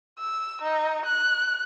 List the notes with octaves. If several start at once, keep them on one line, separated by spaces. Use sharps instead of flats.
E6
D#4
F#6